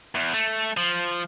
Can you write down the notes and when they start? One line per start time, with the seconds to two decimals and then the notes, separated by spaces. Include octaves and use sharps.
0.15 E2
0.34 A3
0.77 F3